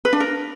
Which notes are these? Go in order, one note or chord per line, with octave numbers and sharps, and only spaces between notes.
B4
D4
A#4